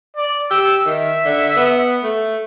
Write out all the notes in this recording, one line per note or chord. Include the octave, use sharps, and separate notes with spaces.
D5
G4 E6
D#3 E5
D3
B3
A3